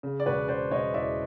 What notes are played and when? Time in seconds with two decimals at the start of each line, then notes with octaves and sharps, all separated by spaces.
0.03 C#3
0.20 D5
0.26 E1 B4 C#5
0.48 C#3 C5 D5
0.71 E1 C#5 D#5
0.94 E2 D5 E5